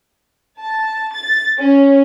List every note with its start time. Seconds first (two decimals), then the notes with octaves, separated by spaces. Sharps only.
0.58 A5
1.11 A6
1.57 C#4